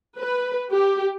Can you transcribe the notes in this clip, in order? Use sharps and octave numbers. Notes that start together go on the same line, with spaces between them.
B4
G4